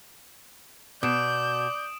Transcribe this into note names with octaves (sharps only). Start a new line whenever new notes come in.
B2 D5 D#6 G6 D7 E7